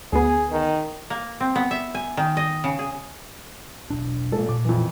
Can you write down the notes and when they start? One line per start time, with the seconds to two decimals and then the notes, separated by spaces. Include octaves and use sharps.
0.13 D2 B3 G#4
0.52 D#3
1.10 A#3
1.40 C4
1.55 B3
1.71 E5
1.95 G#5
2.17 D#3
2.37 D#5
2.64 C#3
2.79 G#4
3.90 E1 B1 D4
4.32 A#1 G#3 A4
4.49 A#2 D6
4.65 F2 E3